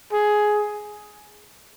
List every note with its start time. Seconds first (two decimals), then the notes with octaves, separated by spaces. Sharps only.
0.13 G#4